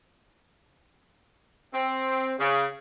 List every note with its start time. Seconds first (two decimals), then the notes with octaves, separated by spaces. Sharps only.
1.74 C4
2.39 C#3